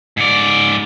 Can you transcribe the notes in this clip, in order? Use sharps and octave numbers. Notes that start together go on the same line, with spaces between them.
G#2 D5